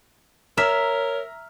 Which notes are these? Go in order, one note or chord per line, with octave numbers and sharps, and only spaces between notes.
A#4 C#5 E5 A#5 F6 B6